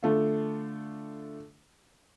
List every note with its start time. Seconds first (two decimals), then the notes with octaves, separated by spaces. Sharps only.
0.03 D3 A3 F4